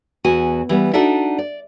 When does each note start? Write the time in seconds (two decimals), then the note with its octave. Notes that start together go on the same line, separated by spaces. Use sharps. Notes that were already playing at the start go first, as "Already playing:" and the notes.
0.24 E2 F#4 G#5
0.69 E3 G3 B3
0.93 D4 D#4 F#4 A4 D5 E5
1.38 D5